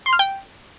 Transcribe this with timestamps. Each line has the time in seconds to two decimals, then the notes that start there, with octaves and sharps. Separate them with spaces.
0.06 C6
0.13 F6
0.19 G5